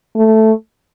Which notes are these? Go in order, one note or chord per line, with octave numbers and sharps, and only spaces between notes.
A3